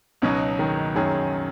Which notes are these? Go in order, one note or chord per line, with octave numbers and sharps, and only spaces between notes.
C#2 B2 F#3 C#4 D#4
D#3
F#2 D#3 F#3 C#4 G#4